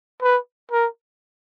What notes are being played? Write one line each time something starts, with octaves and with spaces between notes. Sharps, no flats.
B4
A#4